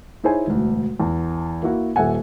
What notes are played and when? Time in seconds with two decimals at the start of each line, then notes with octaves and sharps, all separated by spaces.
0.24 D#4 E4 G#4 C5 C#5 G#5
0.47 E1 D2
1.00 E2 A5
1.63 A#3 E4 F#4
1.96 D#1 A4 E5 F#5 G#5